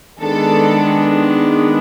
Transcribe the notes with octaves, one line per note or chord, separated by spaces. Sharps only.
D#3 G#3 B3 D4 A4